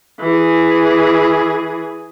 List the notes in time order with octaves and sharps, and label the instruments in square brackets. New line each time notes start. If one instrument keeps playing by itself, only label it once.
[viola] E3 G#4